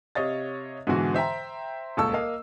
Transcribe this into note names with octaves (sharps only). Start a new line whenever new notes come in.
C3 C#5 D#5 F5 A6
G#2 B2 D3 E3 F#4
C5 E5 G5 A#5
D#1 C#2 A4 A5 C#6 E6
A#3 D#5 F5